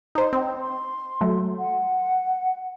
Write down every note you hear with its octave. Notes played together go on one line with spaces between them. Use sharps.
D#4 C5
C4
C6
F#3 A3
F#5